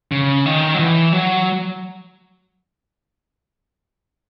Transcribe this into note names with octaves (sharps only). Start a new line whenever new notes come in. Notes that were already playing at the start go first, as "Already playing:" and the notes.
C#3
D#3
F#3
E3
F#3